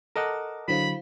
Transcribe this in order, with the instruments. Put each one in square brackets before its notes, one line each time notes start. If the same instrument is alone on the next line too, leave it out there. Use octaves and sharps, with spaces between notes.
[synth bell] A4 A5 D6 [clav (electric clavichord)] A#4 D#5 F#5
[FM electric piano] D3 F#3 [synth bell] E4 C5 F5 [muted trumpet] B5